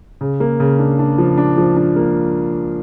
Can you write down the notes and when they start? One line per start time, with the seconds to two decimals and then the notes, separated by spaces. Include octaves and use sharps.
0.21 C#3
0.40 A#3
0.60 C#3
0.79 D4
0.99 D4
1.18 F3
1.38 D4
1.57 F3
1.76 D4
1.96 A#3